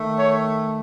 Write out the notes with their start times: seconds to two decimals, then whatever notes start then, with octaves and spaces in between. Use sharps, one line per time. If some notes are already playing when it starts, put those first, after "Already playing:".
Already playing: D#3 A3
0.17 C#5